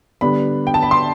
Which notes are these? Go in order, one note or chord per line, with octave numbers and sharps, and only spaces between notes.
D3 G3 B3 D4 B5
G5
A5
B5
C6